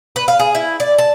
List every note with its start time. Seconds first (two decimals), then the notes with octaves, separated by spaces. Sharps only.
0.16 B4
0.28 F5
0.39 G#4
0.55 E4
0.80 D5
0.98 A5